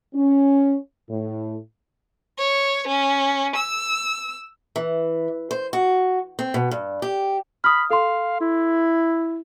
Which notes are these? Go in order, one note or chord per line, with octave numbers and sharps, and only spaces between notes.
C#4
A2
C#5
C#4
E6
E3
C5
F#4
C4
B2
G2
G4
B5 D#6 F6
A4 F5 C6
E4